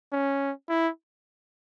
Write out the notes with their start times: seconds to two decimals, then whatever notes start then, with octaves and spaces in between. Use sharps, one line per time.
0.12 C#4
0.69 E4